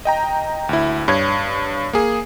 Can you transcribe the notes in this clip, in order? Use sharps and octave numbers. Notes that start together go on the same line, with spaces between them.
D#5 G5 A#5
D2 E4
G2 C#5 G#6
A#3 G#4